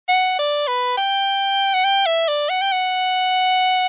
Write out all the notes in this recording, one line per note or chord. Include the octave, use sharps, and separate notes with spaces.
F#5
D5
B4
G5
F#5
G5
E5
D5
F#5
G5
F#5